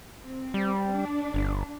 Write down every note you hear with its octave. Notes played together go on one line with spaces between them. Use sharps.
C4
G3
D4
G1